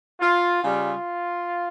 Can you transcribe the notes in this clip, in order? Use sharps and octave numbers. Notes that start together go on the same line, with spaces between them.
F4
C#3 G3 F4